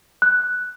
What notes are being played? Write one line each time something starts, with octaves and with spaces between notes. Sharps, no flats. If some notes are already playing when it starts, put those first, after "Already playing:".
F#6